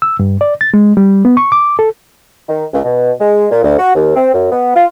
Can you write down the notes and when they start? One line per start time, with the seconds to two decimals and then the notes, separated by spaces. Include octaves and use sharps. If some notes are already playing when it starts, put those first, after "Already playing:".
0.02 E6
0.19 G2
0.41 D5
0.61 A6
0.74 G#3
0.97 G3
1.25 B3
1.37 C#6
1.52 D6
1.79 A4
2.49 D#3
2.73 C#2
2.84 B2
3.20 G#3
3.50 A#2
3.63 D2
3.78 F#4
3.95 D#2
4.16 C4
4.33 F#2
4.51 B3
4.75 F4